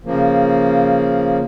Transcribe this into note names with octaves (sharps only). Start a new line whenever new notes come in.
C#3 F3 A#3